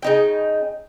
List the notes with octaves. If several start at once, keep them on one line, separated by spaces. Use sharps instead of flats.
C#3 D#4 G5